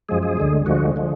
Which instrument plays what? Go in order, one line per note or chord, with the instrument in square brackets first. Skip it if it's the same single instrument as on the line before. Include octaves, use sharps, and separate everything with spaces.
[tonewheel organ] F#2 F3 G#3 G#4
G#4
D2 D3 G#3
D2 D3 F3 G#3 F#4
D3 F3 G#3